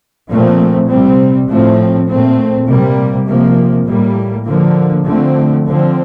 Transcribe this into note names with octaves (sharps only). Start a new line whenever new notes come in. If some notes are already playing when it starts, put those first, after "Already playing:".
A#2 F3 A3 C4
C3 G3 C4
A2 F3 A3 C4
A#2 A3 C4
C3 G3 A#3
C3 F3 A#3
A2 G3 A#3
D3 F3 A#3
D3 F3 A3 C4
D3 F3 C4